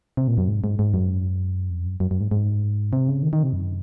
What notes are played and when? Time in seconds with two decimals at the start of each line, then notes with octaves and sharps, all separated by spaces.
0.17 C3
0.28 A#2
0.38 F#2
0.49 G#2
0.64 G#2
0.79 G#2
0.94 F#2
1.70 F2
1.86 F#2
2.00 F#2
2.11 F#2
2.21 G#2
2.31 G#2
2.93 C3
3.08 C#3
3.23 D#3
3.33 D#3
3.43 C3
3.53 F#2